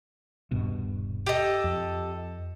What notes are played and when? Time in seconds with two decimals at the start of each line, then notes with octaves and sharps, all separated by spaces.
0.51 D#1 G2 B2
1.26 G4 A4 D#5
1.64 F2